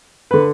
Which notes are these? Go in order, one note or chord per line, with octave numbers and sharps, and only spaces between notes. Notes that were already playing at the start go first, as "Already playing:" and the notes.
D3 B4